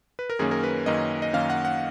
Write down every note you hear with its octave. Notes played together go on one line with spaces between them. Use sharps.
B4
A#4
F#2 D#3 A#3 C#4 G#4
A#4
B4
F#2 D#3 A#3 C#4 D#5
D#5
F#2 D#3 A#3 C#4 F5
F#5
F#5